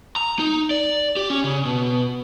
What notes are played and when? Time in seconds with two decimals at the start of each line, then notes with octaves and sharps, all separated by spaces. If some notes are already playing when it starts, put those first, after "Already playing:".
0.16 A#5
0.39 D#4
0.71 D5
1.16 G4
1.30 C#4
1.44 C#3
1.65 B2